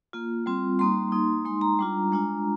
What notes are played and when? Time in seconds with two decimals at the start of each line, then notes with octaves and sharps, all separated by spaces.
0.13 A#3 F4
0.46 G3 C4 F4
0.79 G3 A#3 D#4 C6
1.12 A#3 D#4
1.45 G#3 D#4 C6
1.61 A#5
1.79 G3 D4 F4
2.12 G#3 D4 F4